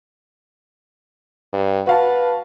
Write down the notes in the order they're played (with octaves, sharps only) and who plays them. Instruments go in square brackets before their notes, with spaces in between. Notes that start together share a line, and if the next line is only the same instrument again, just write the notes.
[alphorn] G2
[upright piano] F#4 F5 A5 [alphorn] B4